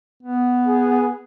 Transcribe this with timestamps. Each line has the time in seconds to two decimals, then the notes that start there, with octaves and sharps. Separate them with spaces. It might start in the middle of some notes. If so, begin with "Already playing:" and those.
0.23 B3
0.67 G#4